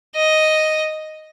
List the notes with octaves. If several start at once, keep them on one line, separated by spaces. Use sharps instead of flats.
D#5